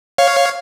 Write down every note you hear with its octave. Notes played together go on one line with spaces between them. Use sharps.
C#5 F5